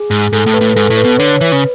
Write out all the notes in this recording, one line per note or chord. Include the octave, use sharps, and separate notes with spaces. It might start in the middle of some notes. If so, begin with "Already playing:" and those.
Already playing: G#4
G#2
G#2 A4
A2
B4
A2
G#2 A4
A2
B4
B2
D3 C#5
E3 B4
C#3